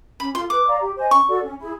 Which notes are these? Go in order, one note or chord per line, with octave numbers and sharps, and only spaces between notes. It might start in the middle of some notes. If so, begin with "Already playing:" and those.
C#4 B5
F4 A4 C6
B4 D6
D5 F5 A#5
G4
C5 D#5 G#5
C#4 C#6
F#4 A4 D5
C#4
E4 G#4